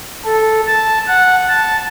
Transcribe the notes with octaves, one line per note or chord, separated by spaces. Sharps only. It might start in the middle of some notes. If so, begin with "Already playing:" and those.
A4
A5
F#5
A5